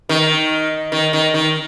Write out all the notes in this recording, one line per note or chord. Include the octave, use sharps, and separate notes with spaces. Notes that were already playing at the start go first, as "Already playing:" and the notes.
D#3
D#3
D#3
D#3